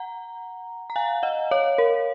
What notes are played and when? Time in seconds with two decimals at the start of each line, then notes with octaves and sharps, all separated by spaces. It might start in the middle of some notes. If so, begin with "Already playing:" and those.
Already playing: F#5 A#5
0.90 A#5
0.96 F5 G#5
1.23 D#5 F#5
1.51 C#5 F5
1.78 A#4